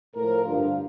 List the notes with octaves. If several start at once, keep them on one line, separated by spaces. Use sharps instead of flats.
A2 F3 A#4
G2 D3 F3 F4